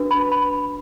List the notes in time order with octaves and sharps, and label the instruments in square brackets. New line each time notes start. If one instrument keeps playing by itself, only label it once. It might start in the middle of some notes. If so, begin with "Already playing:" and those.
Already playing: [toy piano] D4 F#4 B4
B5
B5